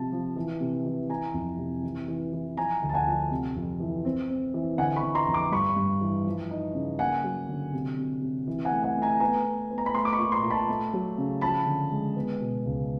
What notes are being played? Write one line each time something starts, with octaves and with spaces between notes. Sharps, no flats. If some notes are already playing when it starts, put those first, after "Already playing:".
Already playing: C3 F3 A5
F3
E3
C3
E3
E3 G#5 A#5
F2
C3
E3
E3
E3
F3 G#5 A#5
D2
A5
F#5 G#5
F3
C3
F2
E3
C4
C4
E3
D3 F#5 G#5
B5 C#6
D3
A#5 C6
F2
C6 D6
G2 B5 C#6
G2
E3
F3
D#4
C#3
A#3 F#5 G#5
F#3
D3
C3
C3
C3
E3
F#5 G#5
A3
F#5 G#5
A3
G#5 A#5
B3 G#5 A#5
B3
B3
A#5
B5
A3 A#5 C6
D6
B5 C#6
A#2
A#5 C6
A#2
A5 B5
A3
F#3
C#3
F3 A5 B5
D3
G#3
B3
B2
C#2